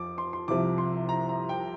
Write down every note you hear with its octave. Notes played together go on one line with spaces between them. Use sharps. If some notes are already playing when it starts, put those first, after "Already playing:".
Already playing: F2 F3 D6
C6
C6
C2 C3 F3 D6
C6
A#5
A#5
G5